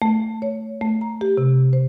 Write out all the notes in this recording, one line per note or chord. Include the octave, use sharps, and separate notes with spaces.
A3
C#5
A3
A#5
G4
C3
C5